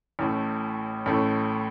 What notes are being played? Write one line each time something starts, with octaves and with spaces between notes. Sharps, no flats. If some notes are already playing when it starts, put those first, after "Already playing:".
A1 A2 A3
A1 A2 A3